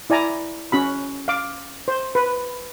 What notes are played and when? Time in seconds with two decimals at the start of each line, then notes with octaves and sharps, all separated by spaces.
0.10 E4 D5 G#5 A#5
0.72 C#4 F#4 B5
1.28 F5 D6
1.88 C5
2.15 B4